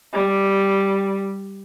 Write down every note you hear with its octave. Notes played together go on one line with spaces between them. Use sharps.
G3